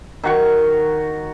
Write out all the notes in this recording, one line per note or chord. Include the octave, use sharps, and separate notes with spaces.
D#3 F#4 C#6